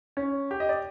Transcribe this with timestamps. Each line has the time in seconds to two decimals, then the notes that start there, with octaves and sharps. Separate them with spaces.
0.17 C#4
0.51 G4
0.60 D#5
0.69 D5